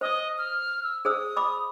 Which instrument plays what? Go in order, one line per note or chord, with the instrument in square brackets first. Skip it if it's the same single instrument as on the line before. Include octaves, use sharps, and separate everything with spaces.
[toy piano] C5 D#6 [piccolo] D#5
[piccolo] F6
E6
[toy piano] G#4 C5 E6 [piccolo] D#6
[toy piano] B5 D6